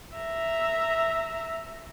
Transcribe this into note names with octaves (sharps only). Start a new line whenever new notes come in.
E5 A#5